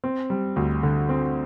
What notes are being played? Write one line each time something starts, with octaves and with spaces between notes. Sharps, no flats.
C4
G3
D2
D3
C4